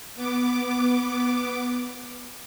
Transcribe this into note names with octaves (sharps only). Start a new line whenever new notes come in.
B3 D6